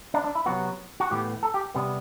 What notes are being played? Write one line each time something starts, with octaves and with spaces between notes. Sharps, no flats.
D4
D4
E4
C3 F#3 B3 F#4
F#4
A2 E3 B3 G4
A4
G4
C3 G3 B3